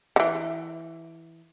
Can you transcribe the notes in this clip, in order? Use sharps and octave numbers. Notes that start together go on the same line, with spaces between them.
D3 E3